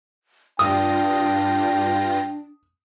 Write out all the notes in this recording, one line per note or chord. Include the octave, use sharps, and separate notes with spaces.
G2 D4 F4 G5 D#6 A#6